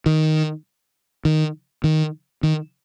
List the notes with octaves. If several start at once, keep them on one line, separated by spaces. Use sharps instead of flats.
D#3
D#3
D#3
D#3